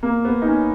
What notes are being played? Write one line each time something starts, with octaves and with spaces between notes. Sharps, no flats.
A#3
B3
D#4
C#4